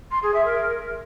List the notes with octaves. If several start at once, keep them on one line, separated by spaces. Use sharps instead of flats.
C6
G#4
E5
A#4